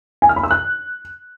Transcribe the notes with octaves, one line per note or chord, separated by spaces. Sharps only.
G#5
F6
B5
E6
F#6